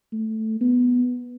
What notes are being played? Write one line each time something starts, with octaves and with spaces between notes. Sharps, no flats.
A3
B3